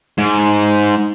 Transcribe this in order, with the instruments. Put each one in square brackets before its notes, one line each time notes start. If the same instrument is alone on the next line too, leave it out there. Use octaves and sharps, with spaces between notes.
[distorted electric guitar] G#2